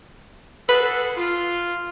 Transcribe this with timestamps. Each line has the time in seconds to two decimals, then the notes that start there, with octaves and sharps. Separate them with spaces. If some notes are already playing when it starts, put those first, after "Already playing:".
0.69 F#4 G#4 A4 B4
1.17 F4